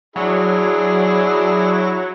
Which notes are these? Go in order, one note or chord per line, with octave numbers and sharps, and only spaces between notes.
F#3 D4 E4 G#4